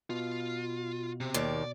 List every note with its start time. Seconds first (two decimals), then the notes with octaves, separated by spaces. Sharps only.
0.10 B2 F4
1.21 C3
1.34 D#2 D#3 D5